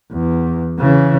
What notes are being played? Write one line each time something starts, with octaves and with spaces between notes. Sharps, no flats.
E2
C#3 E3